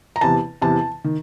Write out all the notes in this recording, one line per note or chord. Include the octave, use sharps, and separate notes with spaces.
A#5
E2 C3 E3 A5
E2 C3 E3 A5
D#3